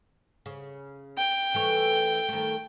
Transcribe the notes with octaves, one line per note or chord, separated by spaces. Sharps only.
C#3
G5
E3 A3 C#5
D#3 A3